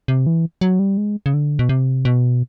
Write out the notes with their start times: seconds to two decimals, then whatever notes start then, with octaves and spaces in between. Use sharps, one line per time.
0.08 C3
0.27 E3
0.61 F#3
0.79 G3
0.97 G#3
1.26 C#3
1.34 D3
1.59 B2
1.69 C3
2.05 B2